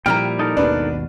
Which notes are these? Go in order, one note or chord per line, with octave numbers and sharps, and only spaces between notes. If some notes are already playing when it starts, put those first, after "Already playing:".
A#2 F3 G3 A#3 E4 G5 A#5 F6
D#4 A4 A#4
G#1 D#2 B2 D4 B4